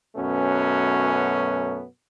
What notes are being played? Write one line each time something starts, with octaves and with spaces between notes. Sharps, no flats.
F#2 B2 A3 B3 C#4